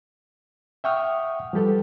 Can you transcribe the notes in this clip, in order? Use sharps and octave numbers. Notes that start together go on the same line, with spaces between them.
E5 F#5 G5 C#6 D#6 F6
F3 G3 G4 A4 B4